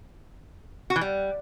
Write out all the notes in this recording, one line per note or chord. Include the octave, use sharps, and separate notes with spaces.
F#4
E3
G3